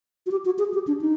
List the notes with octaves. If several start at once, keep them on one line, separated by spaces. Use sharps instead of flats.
F#4
G4
F#4
G#4
G4
D4
D#4